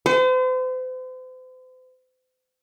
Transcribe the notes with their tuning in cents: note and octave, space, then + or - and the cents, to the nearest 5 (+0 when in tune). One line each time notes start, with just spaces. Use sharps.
C5 -40